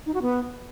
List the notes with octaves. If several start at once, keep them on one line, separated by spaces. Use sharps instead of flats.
D#4
F#4
B3